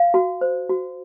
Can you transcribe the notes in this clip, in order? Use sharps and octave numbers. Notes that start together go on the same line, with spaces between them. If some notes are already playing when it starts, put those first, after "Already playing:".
Already playing: F5
F#4
C5
F#4